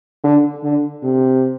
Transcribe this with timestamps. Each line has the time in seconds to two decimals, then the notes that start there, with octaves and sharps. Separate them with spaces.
0.24 D3
0.63 D3
1.03 C3